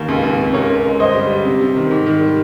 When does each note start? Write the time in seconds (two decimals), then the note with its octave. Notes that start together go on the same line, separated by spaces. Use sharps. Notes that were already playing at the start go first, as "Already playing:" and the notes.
Already playing: D#2 A#4
0.08 C#2
0.23 C#2
0.39 C3
0.54 C#2 A#4 C#5
0.69 C#2
0.84 G#3
0.99 G1 C5 D#5
1.14 G3
1.30 G3
1.45 C3
1.61 C3
1.76 D#3
1.91 G#2
2.06 D#3
2.21 G3